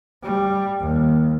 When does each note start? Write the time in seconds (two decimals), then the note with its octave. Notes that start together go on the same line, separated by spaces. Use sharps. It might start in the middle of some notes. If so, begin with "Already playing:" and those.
0.22 G3
0.80 D#2